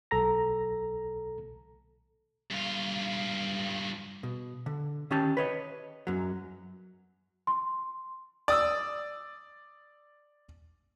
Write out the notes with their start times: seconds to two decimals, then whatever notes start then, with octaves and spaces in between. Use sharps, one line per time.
0.11 B1 A4 A#5 A#6
2.51 G2 F4
4.23 B2
4.66 D3
5.11 D#3 C#4 G4 A5
5.37 B4 C#5 D#5
6.07 F#2 F#3
7.47 C6
8.48 D5 D#6 E6